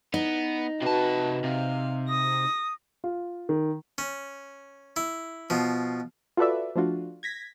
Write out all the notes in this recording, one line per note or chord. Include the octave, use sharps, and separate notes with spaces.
B3 D#4
C3 F#4 B4 A5
C3 F5
D#6 A#6
F4
D#3
C#4
E4
B2 F3
F4 F#4 A4 B4 D5 E5
F3 A3 D4 F4 F#4
G#6 A#6 B6